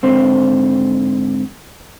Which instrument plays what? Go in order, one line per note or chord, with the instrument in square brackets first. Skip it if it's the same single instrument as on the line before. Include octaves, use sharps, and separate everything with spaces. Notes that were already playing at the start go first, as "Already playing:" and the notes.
[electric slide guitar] G#2 D3 C4 C5